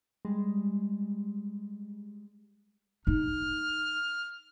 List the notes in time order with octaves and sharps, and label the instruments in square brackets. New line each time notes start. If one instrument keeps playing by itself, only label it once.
[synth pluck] G3 G#3
[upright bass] D#4 [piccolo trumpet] F6